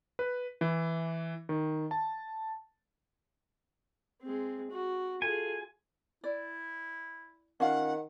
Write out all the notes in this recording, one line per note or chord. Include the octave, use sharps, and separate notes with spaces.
B4
E3
D#3
A5
G#3 C4
F#4
F4 G#4 A4 G#5
E4 D5
D#3 C#4 F4 F5 F#5